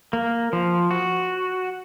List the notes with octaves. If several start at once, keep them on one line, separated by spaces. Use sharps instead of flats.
A#3
F3
F#4